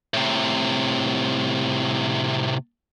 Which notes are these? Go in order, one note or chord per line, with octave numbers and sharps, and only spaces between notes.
A2 C3